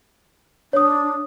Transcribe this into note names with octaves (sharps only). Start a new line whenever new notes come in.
D4 C#5 D#6